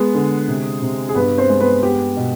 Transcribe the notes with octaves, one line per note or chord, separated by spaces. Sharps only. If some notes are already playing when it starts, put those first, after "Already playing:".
Already playing: G#3 B3 G#4
D3
C3
C3
G#4
G2 B3 B4
C4 C5
G#3
B3 B4
B3 G4
B2